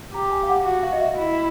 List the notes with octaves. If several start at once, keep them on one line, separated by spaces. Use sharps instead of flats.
G4 A#5
G#5
F5
F#5
F#4 F#5
F5
D#5
E5
E4 D#5